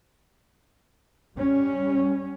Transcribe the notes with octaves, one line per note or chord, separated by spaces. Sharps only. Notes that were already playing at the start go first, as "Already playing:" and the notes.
G3 C#4